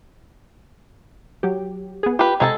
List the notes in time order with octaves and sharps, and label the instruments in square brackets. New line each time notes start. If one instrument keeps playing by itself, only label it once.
[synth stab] F#3 G4
B3 G#4
[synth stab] F4 [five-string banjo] G4 B4
[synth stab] C3 A#5 G#6 [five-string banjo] G#3 A4 A5